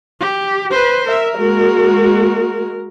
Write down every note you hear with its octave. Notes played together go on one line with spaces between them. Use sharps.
G4
B4 C5
A#4 E5
G#3 A#3 F#4